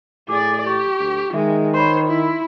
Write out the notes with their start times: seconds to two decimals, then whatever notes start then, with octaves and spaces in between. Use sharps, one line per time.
0.29 A2 G#4 D5 D6
0.67 G4 C#6
0.99 D2
1.34 D#3 G#3 G#4 E5
1.74 C5 C#5 B5 C6
2.08 E4